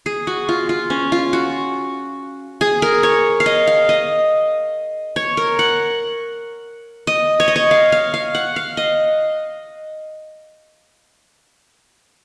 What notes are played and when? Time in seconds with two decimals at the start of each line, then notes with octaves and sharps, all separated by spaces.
0.06 G#4
0.27 F#4
0.49 F4
0.69 F4
0.90 C#4
1.12 F4
1.33 F#4
2.61 G#4
2.82 A#4
3.03 C#5
3.40 F5
3.46 D#5
3.67 F5
3.89 D#5
5.16 C#5
5.37 A#4
5.59 F#5
7.07 D#5
7.40 C#5
7.48 D#5
7.56 C#5
7.71 F5
7.92 F5
8.14 F5
8.35 F#5
8.56 F5
8.77 D#5